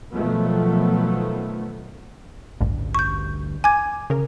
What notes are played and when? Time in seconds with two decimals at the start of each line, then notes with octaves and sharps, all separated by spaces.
0.13 B2 D#3 F3 F#3 A3 B3
2.61 A1 D2 G2
2.95 C#6 G6
3.64 G#5 D6 G#6
4.10 C#3 A#4